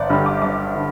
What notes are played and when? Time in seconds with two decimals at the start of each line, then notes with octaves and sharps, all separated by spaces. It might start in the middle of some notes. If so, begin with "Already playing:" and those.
Already playing: G1 D5
0.10 G2 D3 G3 D4 B5
0.26 D6
0.42 G1 D6
0.75 D3